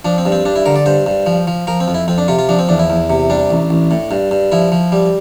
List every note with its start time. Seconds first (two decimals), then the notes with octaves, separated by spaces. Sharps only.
0.05 F3 D4
0.18 C4
0.25 G2
0.32 C4
0.45 G2 D4
0.56 E4
0.66 D3 A#4
0.76 D5
0.86 G2 C5
1.06 G2
1.26 F3
1.47 F3
1.67 F3 A#4
1.80 C4
1.88 F2
1.94 E4
2.08 F2 C4
2.18 D4
2.28 C3 F4
2.39 F4
2.49 F3 D4
2.59 C4
2.69 E2 D4
2.79 E4
2.90 E2
3.10 C3
3.30 G3 D4
3.50 A1
3.70 A1
3.91 A2
4.11 G2
4.31 G2
4.52 F3 E4
4.72 F3
4.92 G3